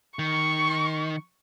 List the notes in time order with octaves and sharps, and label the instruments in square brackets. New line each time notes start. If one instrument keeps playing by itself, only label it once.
[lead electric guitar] D#3 [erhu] C#6